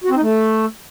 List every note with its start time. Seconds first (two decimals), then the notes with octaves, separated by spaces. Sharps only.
0.04 F#4
0.10 C4
0.16 D#4
0.22 A3